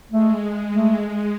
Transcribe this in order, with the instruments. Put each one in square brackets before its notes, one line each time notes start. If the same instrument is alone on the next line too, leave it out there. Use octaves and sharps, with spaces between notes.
[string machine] G#3 [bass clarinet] A3
[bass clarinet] A3